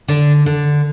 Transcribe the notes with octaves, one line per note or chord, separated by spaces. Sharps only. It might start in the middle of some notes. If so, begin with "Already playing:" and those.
D3 D4
D3